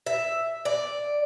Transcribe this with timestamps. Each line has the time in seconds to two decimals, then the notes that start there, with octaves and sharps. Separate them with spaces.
0.06 E5
0.65 D5